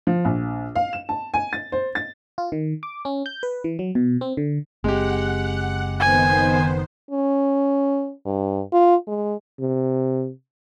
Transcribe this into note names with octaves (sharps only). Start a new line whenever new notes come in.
F3
A#1
F5
E7
A5
G#5
A6
C5
A6
F4
D#3
D6
C#4
G6
B4
E3
F#3
B2
C4
D3
F#1 G#3 C4 G4 F#5
D#3 B3 C5 G#5
C#4
G2
F4
G#3
C3